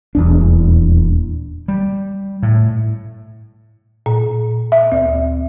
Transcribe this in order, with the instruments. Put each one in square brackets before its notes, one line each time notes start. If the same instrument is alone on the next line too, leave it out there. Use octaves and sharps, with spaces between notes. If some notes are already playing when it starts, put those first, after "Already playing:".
[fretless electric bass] D#1 E2 D4
[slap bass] G3
A2
[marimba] A#2
E5
D2